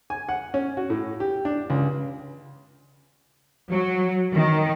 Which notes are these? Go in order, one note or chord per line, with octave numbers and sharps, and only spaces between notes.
G#5
F#5
C#4
F#4
A2
G4
D4
C#2
F#3
D#3